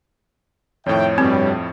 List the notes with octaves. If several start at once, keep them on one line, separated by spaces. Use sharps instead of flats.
F2 A2 D#3 C#5 E5 G5
G2 B2 G3 C4